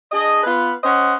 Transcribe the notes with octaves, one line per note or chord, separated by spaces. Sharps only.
D4 G#4 D#5
B3 F4 B4
C#4 C5 D#5 F#5